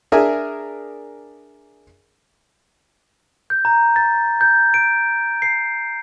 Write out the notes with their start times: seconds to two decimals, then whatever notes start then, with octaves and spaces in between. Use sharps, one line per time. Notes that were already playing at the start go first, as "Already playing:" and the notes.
0.12 D4 G#4 A#4 E5 G#5
3.50 G6
3.65 A#5
3.96 A6
4.41 G6
4.74 D7
5.42 C7